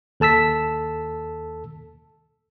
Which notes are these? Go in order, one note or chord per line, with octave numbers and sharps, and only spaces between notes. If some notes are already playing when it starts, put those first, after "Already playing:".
D#2 A4 A5 E6 B6